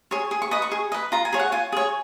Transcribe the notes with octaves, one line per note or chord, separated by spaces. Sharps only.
G#4 C#5
G#4
C#6
B4 D#5 D#6
C#6
G#4
B4 D#5
F4 A#5
G#5
G#4 C#5
F#5
F4 G#5
G#4 C#5